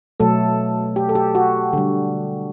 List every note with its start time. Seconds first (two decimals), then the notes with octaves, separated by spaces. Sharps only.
0.20 B2 F#3 A3 A4
0.96 G4
1.09 A4
1.15 G4
1.35 F#4
1.73 D3 G3